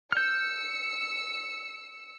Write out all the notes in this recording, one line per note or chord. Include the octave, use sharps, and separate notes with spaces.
E6 F6 G6 C#7